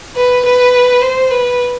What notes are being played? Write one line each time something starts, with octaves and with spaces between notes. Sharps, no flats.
B4
B4
C5
B4